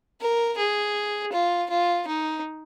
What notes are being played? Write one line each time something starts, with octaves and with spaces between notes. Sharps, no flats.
A#4
G#4
F4
F4
D#4